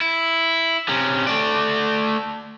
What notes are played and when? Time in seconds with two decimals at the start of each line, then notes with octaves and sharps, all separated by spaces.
0.01 E4
0.89 C3 C#4
1.27 A3 D5